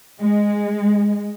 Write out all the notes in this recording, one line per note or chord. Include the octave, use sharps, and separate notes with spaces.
G#3